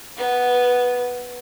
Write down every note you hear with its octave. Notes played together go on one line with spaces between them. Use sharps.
B3